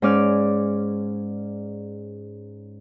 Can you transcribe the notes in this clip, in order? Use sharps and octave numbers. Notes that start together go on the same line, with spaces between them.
G#2 C#4 D5 F6